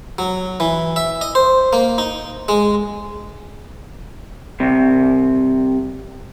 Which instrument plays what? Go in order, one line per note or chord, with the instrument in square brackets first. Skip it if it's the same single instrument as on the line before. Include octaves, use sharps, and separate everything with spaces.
[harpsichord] F#3
E3
E5
D#5
C5
A#3
D#4
G#3
[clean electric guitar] C2 C3